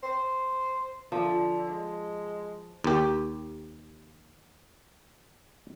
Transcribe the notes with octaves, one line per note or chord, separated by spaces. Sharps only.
C5
D3 F3
G#3
D#2 G4